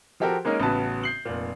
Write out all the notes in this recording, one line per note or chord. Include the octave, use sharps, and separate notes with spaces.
F3 F#4 G4 A4 A#4 C5
G#3 A#3 C#4 D#4 A#4
A1 C#3 B3 F#4 B4 A5
G6 C7 F#7
F1 A#2